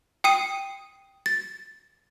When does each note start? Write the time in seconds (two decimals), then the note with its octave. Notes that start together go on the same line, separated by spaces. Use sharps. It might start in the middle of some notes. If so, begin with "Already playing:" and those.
0.24 G5 D#6 C7 D#7
1.26 A6